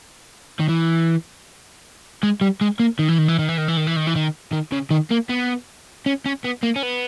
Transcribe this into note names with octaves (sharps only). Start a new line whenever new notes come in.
D#3
E3
G#3
G3
G#3
A#3
D#3
E3
D#3
E3
D#3
E3
D#3
E3
D#3
E3
D#3
E3
D#3
D#3
C#3
D#3
A#3
B3
C#4
C#4
B3
A#3
C#4
B3